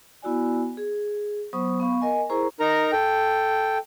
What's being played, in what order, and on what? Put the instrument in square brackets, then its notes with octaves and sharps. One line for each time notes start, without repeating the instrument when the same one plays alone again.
[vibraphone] B3 E4 F#4 D5 G#5
G#4
F#3 B3 C5 C#6 D#6
B3 F5 C#6
A#4 D#5 G#5
E4 G#4 A#4 C5 A#5 C#6
[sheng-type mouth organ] D#4 A#4 A#5
A4 G5